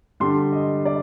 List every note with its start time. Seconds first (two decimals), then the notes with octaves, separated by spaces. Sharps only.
0.20 D3 G3 C6
0.52 D#5
0.85 D5